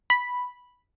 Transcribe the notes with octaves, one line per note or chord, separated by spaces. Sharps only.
B5